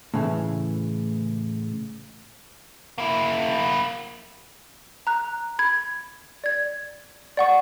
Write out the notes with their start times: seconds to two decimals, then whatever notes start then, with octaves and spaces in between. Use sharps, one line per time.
0.14 A2 C#3 E3
2.98 A#3 E4
5.07 A#5 F#6
5.59 B5 G#6
6.44 D5 G#6
7.37 D5 F#5 C#6